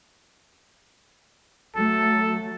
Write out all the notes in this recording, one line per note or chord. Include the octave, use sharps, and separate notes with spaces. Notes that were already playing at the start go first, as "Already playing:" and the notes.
F#3 A3 A4